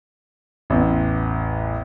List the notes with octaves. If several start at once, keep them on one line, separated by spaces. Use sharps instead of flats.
A1 E2